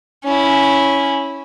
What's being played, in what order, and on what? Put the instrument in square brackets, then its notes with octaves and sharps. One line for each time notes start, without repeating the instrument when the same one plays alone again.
[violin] C#4 E4